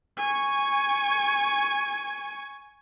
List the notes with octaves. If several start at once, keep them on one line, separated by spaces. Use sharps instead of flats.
G#5 C#6